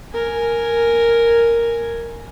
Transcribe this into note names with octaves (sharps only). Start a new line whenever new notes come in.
A#4 G#5